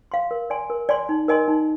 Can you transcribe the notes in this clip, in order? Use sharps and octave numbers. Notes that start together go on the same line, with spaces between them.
F5 C6
A#4
D5 G#5 C6
A#4
D5 G#5 C6
D#4
A#4 D#5 G#5 C6
D#4